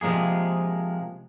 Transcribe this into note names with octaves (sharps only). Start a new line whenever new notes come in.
C3 F3 G#3 A#3 G#4